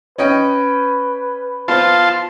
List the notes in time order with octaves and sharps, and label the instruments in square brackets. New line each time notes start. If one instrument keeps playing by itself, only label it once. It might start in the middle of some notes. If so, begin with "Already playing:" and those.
[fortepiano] C#4 D#5 G5 [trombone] B4
[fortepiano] B3 C5 [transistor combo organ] F4 A5 C6